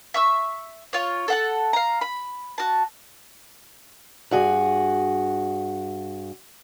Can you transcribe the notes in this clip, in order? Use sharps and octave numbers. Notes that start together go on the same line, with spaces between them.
E5 C#6 E6
F4 C#5
A4 F#5 A5
F5 A#5
B5
F#4 A5
G2 F#4 G#4